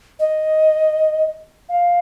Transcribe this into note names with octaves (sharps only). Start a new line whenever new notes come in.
D#5
F5